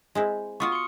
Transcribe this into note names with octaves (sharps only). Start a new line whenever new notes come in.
G#3 C4 E4
B3 F4 F#4 C#6 D#6 F6
C6 C#7